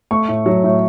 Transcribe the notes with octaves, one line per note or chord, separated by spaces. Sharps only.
A3 C#6
A2
F#3
A2